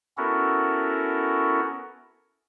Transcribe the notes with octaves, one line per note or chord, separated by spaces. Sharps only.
B3 C#4 E4 F#4 A4 A#4